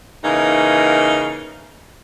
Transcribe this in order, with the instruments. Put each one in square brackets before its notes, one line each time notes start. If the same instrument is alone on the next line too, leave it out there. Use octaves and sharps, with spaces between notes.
[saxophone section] C#3 E3 A#3 D#4